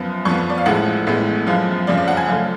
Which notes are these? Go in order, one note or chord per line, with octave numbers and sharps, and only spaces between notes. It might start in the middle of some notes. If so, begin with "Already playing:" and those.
Already playing: F#2 F3 B3
F2 F3 B3 C#6
D5
F5
A1 A2 F3 G#3 F#5
A1 A2 G#3 B3
F#2 F3 G#3 B3 F5
F#1 F2 C#3 F3 D5
D5
F#5
G#5
F#2 F3 A3 F5